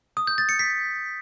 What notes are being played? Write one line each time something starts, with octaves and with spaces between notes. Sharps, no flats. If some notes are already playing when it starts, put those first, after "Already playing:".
D#6
G6
A6
C#7
B6